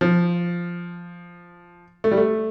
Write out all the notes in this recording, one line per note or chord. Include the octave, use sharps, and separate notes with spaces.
F3
A3
G3
A3